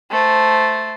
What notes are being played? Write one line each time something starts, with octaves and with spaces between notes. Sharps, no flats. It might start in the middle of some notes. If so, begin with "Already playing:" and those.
A3 C5